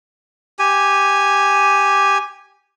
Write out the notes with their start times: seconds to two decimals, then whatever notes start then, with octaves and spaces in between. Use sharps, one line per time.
0.59 G4 G#5